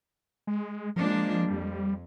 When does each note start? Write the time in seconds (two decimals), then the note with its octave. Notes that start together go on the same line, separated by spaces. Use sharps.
0.47 G#3
0.96 F3 G#3 A#3 D4
1.47 F2 G3